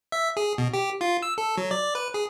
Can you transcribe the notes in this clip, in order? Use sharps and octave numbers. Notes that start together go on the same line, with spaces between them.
E5
G#4
B2
G4
F4
E6
A4
F#3
D5
B4
G#4